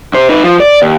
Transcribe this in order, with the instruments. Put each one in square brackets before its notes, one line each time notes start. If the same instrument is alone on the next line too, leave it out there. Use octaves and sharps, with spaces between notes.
[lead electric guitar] C3 C5
D#4 B4
F3
D5
D#2